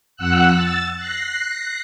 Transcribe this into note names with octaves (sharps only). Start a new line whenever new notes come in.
F2 F#5 E6 F#6
E6 A6
F#6 A#6 C7